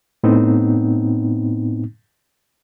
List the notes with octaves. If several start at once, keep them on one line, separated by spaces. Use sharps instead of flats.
A2 B3 C4 D#4